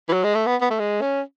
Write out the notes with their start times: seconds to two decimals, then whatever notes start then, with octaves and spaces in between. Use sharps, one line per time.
0.09 E3
0.13 F#3
0.24 G#3
0.35 A3
0.46 B3
0.61 B3
0.70 A3
0.79 G#3
1.01 C#4